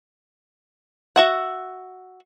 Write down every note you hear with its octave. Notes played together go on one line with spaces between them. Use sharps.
F#4 E5 F#5